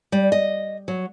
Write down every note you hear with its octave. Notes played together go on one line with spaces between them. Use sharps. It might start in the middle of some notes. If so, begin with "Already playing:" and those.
G3
D#5
F#3